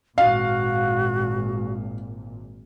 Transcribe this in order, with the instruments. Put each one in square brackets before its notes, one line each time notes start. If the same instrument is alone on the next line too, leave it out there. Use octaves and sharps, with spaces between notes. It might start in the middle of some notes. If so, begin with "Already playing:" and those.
[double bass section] G#1 A#2 [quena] F#4 [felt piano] F5